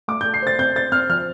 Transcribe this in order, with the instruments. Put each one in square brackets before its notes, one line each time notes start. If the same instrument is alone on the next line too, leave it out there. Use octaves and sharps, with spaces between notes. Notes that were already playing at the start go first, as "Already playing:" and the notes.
[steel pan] A3 [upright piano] D6
[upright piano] G6
[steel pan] A4
[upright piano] C7
[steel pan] C5 [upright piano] A6
[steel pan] C4 [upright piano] G6
[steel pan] C5 [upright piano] A6
[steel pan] C4 [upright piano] F6
[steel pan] F3 [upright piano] F6